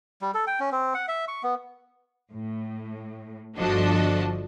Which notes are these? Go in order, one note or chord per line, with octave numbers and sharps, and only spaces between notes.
G3
A4
G5
C#4
C4
F#5
E5
C#6
B3
A2
G1 F3 D4 F#4 A4 D#5